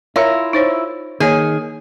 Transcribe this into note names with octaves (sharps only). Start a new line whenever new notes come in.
E4 F4 A#4 C#5 E5
D#4 C5 C#5
D#3 A#3 G#4 C#5